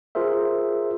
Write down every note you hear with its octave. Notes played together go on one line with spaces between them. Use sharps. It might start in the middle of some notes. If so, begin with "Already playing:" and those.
F4 G#4 A#4 C5 E5